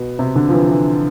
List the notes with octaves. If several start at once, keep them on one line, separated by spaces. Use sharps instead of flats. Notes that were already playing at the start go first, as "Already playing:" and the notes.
Already playing: B2
C3
D3
F3
E3
E3